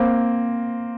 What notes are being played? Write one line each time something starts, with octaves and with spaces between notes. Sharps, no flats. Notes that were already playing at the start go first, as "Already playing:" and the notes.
Already playing: A#3 C4